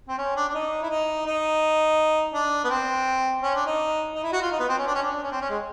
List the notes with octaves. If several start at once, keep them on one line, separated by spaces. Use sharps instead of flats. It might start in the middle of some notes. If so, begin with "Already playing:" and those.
C4
C#4
D4
D4
D#4
E4
D#4
D#4
D4
B3
C4
C#4
D4
D#4
D#4
E4
F#4
F4
D#4
B3
C4
C#4
D4
C#4
D4
C#4
C4
C#4
G#3